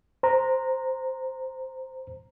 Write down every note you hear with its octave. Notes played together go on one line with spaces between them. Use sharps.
C5 A#5